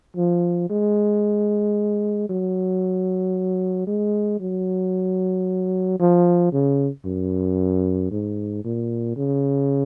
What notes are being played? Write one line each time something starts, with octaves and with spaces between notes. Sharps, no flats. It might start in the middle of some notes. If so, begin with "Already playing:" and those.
F3
G#3
F#3
G#3
F#3
F3
C#3
F#2
G#2
A#2
C#3